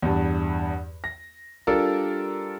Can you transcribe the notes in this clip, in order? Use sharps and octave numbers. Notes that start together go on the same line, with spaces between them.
E2 G2
A#6
G3 D4 F4 A4 A#4